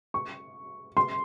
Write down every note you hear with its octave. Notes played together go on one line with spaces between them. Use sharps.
C#6
C6